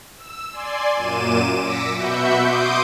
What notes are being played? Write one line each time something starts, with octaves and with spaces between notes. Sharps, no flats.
E6
D5 G#5 C6
F#2 A#2 D6 D#7 E7
D6 E6 A#6 B6 C#7
B2 F#4 E5 B5 G6 C#7
C6 D6 D#6 G6 D7